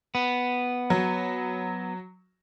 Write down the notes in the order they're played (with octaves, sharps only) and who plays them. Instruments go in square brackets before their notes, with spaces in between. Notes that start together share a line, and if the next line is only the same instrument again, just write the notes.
[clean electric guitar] B3
[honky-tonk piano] F#3